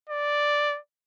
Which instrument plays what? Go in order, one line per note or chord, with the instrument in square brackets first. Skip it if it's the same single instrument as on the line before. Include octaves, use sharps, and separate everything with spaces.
[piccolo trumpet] D5